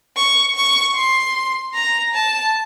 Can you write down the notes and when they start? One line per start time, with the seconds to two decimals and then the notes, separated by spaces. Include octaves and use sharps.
0.16 C#6
0.55 C#6
0.95 C6
1.74 A#5
2.14 A5